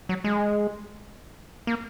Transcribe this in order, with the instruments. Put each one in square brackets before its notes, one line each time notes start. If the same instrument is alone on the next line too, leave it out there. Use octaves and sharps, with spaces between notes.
[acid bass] F#3
G#3
A#3